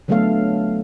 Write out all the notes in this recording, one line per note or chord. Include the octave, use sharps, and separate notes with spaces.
D3 F#3 A3 B3 A4 F5